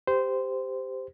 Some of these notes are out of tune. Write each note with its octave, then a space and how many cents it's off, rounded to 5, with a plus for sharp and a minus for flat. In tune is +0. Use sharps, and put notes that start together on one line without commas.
G4 +5 C5 -15